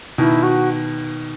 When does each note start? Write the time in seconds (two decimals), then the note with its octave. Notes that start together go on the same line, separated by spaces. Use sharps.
0.18 B2 D#3 E4
0.43 F#4